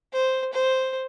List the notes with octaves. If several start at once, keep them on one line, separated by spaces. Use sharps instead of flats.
C5
C5